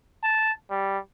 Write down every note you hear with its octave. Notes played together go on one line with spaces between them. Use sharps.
A5
G3